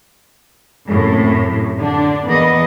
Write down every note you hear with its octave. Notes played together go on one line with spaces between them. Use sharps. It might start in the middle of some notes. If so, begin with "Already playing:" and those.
F#2 A2 C3
D3 D4
E2 E3 A#3 B3 D#5